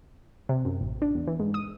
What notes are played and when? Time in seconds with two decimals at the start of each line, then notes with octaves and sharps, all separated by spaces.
0.49 C3
0.65 F#2
0.81 A1
1.02 D4
1.15 E2
1.27 E3
1.39 G#2
1.54 D#6